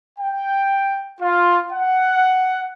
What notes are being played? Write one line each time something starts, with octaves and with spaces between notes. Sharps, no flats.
G5
F4
F#5